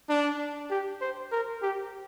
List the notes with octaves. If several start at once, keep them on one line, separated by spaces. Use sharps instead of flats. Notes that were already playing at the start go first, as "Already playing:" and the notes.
D4
G4
C5
A#4
G4